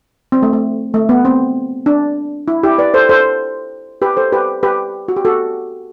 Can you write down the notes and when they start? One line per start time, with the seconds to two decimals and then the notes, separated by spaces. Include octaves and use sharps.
0.32 C4
0.43 A3
0.53 A3
0.94 A3
1.09 B3
1.25 C4
1.86 D4
2.48 E4
2.63 E4 G4
2.78 B4 D5
2.94 A4 C5
3.09 A4 C5
4.02 G4 B4
4.17 A4 C5
4.32 G4 B4
4.63 G4 B4
5.08 F#4
5.16 G4
5.25 F#4 A4